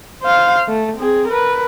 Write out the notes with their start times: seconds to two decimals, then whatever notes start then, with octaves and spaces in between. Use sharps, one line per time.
0.23 C5 F5
0.68 A3
0.97 C4 G#4
1.28 A#4 B4